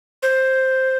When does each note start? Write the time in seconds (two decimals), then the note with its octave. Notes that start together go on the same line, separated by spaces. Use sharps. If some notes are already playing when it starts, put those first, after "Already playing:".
0.23 C5